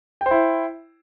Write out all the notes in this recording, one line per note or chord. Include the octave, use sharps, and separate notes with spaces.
E4 C5 G5